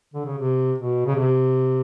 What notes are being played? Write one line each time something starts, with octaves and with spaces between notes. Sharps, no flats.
D3
C#3
C3
B2
C#3
C3